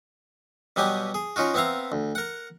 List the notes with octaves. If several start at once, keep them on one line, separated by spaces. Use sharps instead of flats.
B2 F#3 G3 B3 G4 G#5
G#4
C#4 D#4 F4 F#4
B3 C4 E5 F5 A#5
D2
A#4 F#5